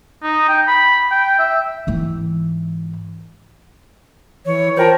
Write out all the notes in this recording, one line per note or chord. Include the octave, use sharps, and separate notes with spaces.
D#4
G5
B5
G5
E5
G#2 E3
E3 C#5
F4 A#4 C5 G5 A5